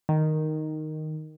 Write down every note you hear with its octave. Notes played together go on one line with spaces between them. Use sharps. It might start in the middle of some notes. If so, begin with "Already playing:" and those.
D#3